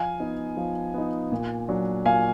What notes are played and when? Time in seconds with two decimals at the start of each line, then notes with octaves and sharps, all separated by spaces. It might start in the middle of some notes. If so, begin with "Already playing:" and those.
Already playing: F3 F5 G#5
0.20 B3 D#4
0.57 F3
0.94 B3 D#4
1.32 A#2
1.68 F#3 D4
2.05 A#2 F5 G#5